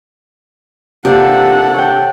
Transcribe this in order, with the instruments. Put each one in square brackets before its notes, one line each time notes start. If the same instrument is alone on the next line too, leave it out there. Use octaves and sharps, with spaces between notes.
[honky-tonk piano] C3 [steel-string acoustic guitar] A#3 D4 F4 [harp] G4 [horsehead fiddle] A4 F#5
[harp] C#5 G5